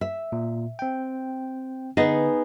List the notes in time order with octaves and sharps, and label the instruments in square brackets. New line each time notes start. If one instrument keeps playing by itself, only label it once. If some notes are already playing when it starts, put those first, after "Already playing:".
[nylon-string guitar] E5
[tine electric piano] A#2
C4 G5
[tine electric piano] D3 [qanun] B3 D#4 G#4 [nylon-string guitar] D#5